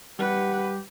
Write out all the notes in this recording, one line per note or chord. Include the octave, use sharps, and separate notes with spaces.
G3 G4 B4 F#5